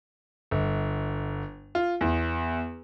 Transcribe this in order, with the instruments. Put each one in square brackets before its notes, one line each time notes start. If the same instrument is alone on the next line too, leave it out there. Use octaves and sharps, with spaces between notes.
[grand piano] G1
F4
E2